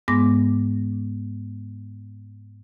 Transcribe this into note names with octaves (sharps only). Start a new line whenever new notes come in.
G#2 G#3 B3 D6 A#6